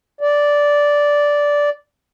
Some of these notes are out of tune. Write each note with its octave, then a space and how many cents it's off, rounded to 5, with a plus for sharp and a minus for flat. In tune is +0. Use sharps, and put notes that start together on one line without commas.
D5 -10